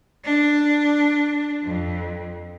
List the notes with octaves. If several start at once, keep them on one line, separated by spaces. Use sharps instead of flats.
D4
F2